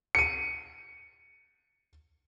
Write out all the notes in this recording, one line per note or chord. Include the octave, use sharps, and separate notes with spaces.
C#7 D#7